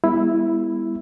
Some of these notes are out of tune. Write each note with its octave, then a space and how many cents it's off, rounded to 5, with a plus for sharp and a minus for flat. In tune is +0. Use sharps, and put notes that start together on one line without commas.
G#3 -45 B3 +0 E4 +0